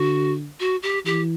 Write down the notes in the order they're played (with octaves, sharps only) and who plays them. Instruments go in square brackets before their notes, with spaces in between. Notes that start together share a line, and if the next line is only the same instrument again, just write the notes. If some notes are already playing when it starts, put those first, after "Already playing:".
Already playing: [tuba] D3 [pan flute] F#4
[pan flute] F#4
G4
[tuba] E3 [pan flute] G4